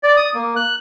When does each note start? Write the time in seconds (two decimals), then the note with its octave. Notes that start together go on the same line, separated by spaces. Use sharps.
0.03 D5
0.17 D#6
0.34 A#3
0.56 F#6